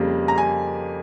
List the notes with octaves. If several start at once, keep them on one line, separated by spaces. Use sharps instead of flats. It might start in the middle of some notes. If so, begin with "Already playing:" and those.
Already playing: F2 C#3 G3 A#3
A#5
G#5